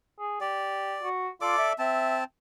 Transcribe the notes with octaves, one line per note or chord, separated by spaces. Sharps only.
G#4
G4 D5
F#4
F4 A4 D5 D6
E5
C4 E5 A5